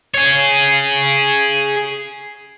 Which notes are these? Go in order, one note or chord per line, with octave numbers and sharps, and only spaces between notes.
G#4 C#5